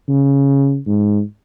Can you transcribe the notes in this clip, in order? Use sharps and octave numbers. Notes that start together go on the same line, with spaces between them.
C#3
G#2